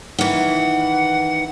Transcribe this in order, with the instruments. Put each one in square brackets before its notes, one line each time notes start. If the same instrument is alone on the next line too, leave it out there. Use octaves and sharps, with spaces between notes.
[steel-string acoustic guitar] D#3 E3 [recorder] F#5